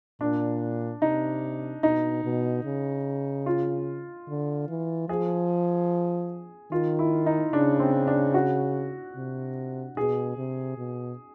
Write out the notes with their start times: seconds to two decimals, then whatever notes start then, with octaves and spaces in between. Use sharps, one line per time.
0.21 A#2 D4
1.02 C3 D#4
1.83 B2 D#4
2.25 B2
2.64 C#3
3.46 F4
4.28 D3
4.68 E3
5.09 F3 G#4
6.71 D#3 F4
6.99 E4
7.26 D#4
7.52 C#3 D4
7.79 C4
8.07 D4
8.34 F#4
9.16 C3
9.96 B2 G#4
10.37 C3
10.78 B2